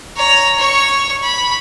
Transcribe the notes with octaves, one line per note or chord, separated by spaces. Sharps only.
C#5 A#5
C#5 C#6
B5